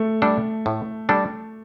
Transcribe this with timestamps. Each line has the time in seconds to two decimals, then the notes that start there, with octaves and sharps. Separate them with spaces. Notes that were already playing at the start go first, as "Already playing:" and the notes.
Already playing: A3
0.22 G3 D4 A4
0.66 A2
1.09 G3 D4 A4